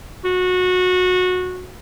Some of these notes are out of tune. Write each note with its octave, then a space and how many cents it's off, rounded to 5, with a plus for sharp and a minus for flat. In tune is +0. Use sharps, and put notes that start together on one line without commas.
F#4 -20